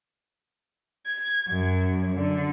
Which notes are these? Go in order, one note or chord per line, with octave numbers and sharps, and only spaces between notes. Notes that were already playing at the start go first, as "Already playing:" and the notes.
G#6
F#2
D3